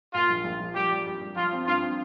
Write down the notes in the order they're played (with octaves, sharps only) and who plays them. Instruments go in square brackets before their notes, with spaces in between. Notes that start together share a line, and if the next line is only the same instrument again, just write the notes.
[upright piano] A#2 [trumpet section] F4
[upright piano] A#1
A#1
F3
[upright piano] G3 [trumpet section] G4
[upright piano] G3
G3
G3
[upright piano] F3 [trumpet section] F4
[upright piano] C4
[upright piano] G2 [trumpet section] F4
[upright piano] C4